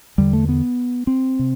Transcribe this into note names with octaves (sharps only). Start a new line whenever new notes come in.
E2 D3 G3
A3
B3
C4
C3